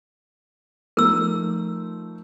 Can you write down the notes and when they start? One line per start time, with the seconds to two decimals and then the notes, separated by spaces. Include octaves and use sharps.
0.97 F3 A3 D#4 A#4 E6